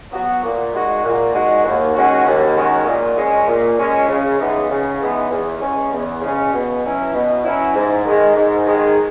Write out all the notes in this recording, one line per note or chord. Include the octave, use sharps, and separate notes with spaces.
F#3 B3 F#4
A#2
G#3 D#4 F#4
A#2
G#3 D#4 F#4
D#2
D#3 G#3 C#4 F#4
D#2
D#3 G#3 C#4 F#4
A#2
G#3 C#4
A#2
G#3 C#4
C#3
E3 G#3 B3 D#4
C#3
E3 G#3 B3 D#4
E2
C#3 G#3 C#4
E2
C#3 G#3 C#4
B2
F#3 C#4 E4
B2
F#3 C#4 E4
G#2
D#3 G#3
G#2
D#3 G#3